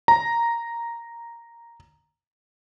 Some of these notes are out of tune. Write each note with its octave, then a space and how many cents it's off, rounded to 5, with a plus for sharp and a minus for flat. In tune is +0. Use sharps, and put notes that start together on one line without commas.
A#5 +0